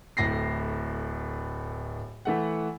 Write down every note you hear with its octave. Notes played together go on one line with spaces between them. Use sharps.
D1 A2 A#6 C7
E3 A3 F#5